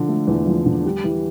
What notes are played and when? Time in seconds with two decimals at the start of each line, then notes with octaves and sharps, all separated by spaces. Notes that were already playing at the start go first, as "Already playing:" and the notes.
Already playing: D3 F3
0.09 A3
0.27 E2
0.47 F3
0.66 D3
0.85 G3
1.04 E3